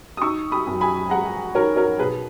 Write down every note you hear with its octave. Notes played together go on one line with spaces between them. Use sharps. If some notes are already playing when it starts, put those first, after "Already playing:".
D#6
D#4 C#6 E6
B5 D#6
F#2
G#5 B5
G#3 F#5 A#5
D#3 A#4 C#5
A#4 C#5
B2 G#4 B4